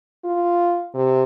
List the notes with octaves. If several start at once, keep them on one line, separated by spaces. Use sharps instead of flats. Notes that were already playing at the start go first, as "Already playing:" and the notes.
F4
C3